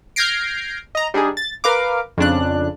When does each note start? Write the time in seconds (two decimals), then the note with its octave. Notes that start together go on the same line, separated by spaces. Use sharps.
0.16 F6 G6 G#6 A#6 C7 D7
0.95 D#5 A#5
1.14 G3 D4 D#4 G#4
1.37 A6
1.64 A#4 B4 F5 D6
2.17 F2 C#3 D4 F#6